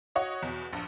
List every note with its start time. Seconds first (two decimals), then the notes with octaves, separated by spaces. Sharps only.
0.15 F#4 C#5 D#5
0.42 E2 B2
0.73 A#1 G2